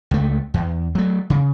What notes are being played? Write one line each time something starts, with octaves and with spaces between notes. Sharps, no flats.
C#2 A3
E2
F#3 A3
C#3